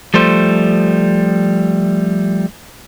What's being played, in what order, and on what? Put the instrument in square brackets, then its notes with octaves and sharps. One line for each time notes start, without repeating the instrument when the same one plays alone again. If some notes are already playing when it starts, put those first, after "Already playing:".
[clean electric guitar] F3 G3 A3 C5